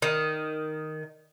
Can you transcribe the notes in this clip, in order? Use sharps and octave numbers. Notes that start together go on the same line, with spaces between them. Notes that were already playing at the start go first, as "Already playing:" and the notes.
D#3